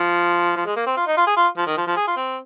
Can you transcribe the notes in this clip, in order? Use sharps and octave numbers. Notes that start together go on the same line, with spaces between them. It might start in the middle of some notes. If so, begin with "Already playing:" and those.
Already playing: F3
F3
G#3
A#3
C4
F4
D#4
F4
G#4
F4
F3
D#3
F3
F3
G#4
F4
C4